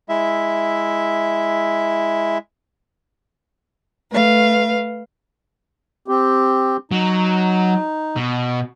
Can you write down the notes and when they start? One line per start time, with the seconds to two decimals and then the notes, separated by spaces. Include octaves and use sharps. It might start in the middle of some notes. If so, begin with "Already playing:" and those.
0.09 G#3 E4 E5
4.11 A3 B4 F5
6.08 C4 G4
6.91 F#3 D#4
8.16 B2